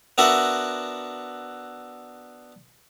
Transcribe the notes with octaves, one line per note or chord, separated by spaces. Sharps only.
B3 D4 F#4 A#4 E5 F#5